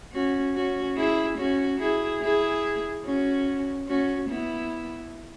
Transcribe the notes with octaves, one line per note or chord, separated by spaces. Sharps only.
C#4 F#4
C#4 F#4
E4 G#4
C#4 F#4
E4 G#4
E4 G#4
C#4 F#4
C#4 F#4
B3 E4